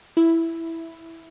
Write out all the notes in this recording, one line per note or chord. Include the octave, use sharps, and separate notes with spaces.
E4